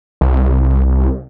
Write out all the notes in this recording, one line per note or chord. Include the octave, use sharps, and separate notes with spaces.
C2